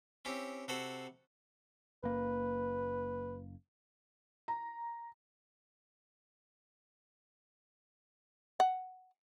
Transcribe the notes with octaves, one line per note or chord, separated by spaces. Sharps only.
C4 C#4 E4 G4
C3 F#4 A4 C5 B5
F#1 A#3 B4
A#5
F#5